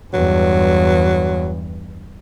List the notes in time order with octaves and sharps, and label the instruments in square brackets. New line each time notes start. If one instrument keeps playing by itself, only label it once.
[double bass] E2 G2 [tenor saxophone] F#3